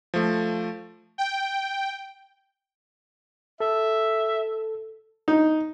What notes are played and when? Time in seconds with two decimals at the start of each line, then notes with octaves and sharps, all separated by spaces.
0.14 F3 A3
1.18 G5
3.60 A4 E5
5.28 D#4